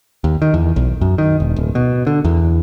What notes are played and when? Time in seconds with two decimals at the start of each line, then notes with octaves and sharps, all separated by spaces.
0.24 D#2
0.42 D#3
0.54 E2
0.76 B1
1.01 F#2
1.18 D#3
1.40 E1
1.56 D1
1.75 B2
2.07 D3
2.25 E2